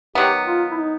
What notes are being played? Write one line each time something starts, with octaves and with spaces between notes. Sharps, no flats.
D#3 F#3 B3 G4
F4
E4
D#4